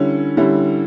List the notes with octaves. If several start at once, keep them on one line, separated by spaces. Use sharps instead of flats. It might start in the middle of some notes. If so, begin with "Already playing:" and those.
Already playing: D3 G3 C#4 E4
D3 G3 C#4 E4